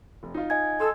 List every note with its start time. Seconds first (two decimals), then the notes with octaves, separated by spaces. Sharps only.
0.23 F1
0.34 D#4 F4
0.50 D#5 G#5 G#6
0.80 A4 C6 D#6 E6